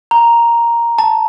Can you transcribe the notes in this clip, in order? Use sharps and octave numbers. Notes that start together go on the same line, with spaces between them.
A#5
A5